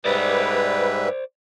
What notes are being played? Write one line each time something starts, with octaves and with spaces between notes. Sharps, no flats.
G#2 G3 B4 C5 D5 E5